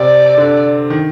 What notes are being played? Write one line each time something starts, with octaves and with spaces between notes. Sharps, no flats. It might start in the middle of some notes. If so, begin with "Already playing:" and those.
Already playing: C3 D5
D3
D#3